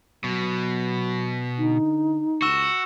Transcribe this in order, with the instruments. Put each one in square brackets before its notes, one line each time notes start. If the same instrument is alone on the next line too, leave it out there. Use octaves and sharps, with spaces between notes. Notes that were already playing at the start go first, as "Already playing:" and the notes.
[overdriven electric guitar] B2 [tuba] F#3
[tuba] D3 [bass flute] D#4
[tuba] C#2 [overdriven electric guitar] F#4 [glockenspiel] C#6 E6 E7